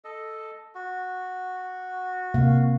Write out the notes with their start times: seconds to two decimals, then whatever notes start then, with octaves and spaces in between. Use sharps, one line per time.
0.04 A4 D#5
0.75 F#4
2.34 C3 A#3 F5